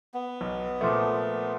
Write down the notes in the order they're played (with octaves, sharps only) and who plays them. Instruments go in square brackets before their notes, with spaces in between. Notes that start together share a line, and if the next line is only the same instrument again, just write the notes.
[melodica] B3
[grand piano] B1
A#2 F3 A3